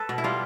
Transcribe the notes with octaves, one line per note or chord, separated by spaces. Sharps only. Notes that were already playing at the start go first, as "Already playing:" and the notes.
Already playing: A4 B4
B2
E4
G3 F4